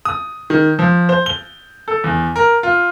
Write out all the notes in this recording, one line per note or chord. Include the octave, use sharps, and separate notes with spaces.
D#6
D#3
F3
C5
G7
A4
E2
A#4
F4